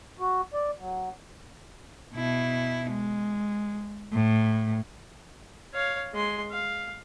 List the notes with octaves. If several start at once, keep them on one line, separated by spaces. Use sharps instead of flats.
F#4
D5
F#3
B2 E4
G#3
A2
C#5 F5
G#3 C6
F5